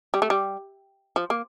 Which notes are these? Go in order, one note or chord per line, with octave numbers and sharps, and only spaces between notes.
G3
A3
G3
F3
A#3